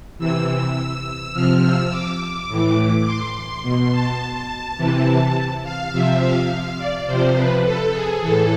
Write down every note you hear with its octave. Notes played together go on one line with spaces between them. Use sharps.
C3 E3 E6
E6
C3 F3 F6
E6
D6
A2 E3
C6
C6
B2 C6
A5
C3 E3
F5
C3 F3 E5
F5
F5
D5
C3 F3 C5
B4
A4
G#4
A2 E3 A4